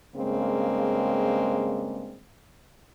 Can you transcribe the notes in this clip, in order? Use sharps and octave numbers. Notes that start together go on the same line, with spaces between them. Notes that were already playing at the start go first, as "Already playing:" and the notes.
G2 C#3 G#3 A#3 C4